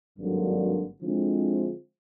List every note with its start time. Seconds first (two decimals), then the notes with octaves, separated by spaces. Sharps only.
0.17 G#1 G2 D3 F#3 A#3
1.01 D3 F3 G#3 C4 E4